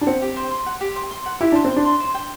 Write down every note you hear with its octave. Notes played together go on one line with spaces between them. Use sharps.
D4
C4 F#5
G4
C5
C6
F#5
G4
C5
C6
F#5
E4 G4
D4 C5
C4
C6
D4
C6
C5
G5